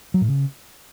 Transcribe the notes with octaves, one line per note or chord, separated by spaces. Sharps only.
F#3
A2
C#3